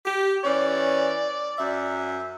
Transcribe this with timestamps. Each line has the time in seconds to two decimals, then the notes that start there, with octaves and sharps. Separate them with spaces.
0.06 G4
0.45 E3 C#4 D5
1.58 F#2 E5